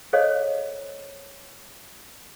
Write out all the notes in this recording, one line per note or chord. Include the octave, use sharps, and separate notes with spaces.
G#4 A4 C5 C#5 D#5 F5